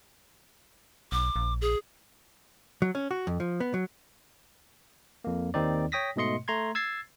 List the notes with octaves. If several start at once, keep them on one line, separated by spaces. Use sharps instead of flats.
B1 D6
A#1
G#4
F#3
C#4
F#4
F2
F3
B3
F#3
F2 A#3
D#2 D#3 C4 D#4 D5
C#5 G5 D#6 A#6 B6
G#2 B2 A3 D#5 C6 C#7
A3 A#5 C6 G#6
E6 G#6 A6 C7